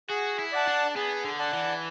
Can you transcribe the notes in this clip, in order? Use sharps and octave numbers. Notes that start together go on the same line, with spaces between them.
F#4 G#4
E4
D5 F#5 A5
D4
B3 G#4
D3
D5 F#5 A5
E3